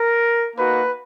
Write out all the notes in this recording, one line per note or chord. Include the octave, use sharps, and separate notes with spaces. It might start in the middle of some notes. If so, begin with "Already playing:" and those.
Already playing: A#4
A#3 D#4 F#4 B4